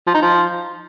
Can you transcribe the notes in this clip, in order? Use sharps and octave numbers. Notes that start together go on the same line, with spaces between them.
F3
D#4
F3